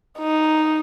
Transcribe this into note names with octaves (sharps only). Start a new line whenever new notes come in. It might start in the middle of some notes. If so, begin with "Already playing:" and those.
D#4